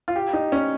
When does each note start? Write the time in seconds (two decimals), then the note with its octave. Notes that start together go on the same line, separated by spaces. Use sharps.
0.08 F4
0.16 G4
0.33 D#4
0.52 C#4